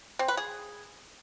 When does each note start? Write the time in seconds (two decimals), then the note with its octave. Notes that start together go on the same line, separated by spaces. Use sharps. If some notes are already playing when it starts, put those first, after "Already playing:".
0.19 C4
0.28 B4
0.37 G#4